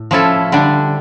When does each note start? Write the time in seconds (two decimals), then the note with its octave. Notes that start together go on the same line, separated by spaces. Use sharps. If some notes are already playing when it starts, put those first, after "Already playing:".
Already playing: A2
0.11 F3 C#4 E4 A4
0.52 D3 G3 D4